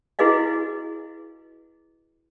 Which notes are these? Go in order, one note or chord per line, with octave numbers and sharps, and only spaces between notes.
E4 F#4 G#4 B4 D#5 F5